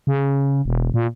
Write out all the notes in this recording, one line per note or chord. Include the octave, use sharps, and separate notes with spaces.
C#3
E1
A#2